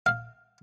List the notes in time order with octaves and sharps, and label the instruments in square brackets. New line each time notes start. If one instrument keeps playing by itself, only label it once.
[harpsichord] F5